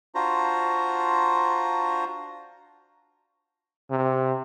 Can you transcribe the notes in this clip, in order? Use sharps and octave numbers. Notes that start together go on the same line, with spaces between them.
D4 F4 F#4 C5 A#5
C3